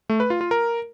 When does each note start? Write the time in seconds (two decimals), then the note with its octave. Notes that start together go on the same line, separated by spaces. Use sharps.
0.09 A3
0.20 B4
0.30 F4
0.41 F4
0.51 A#4